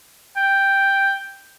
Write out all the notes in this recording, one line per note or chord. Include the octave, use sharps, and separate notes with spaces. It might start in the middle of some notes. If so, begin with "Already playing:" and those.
G5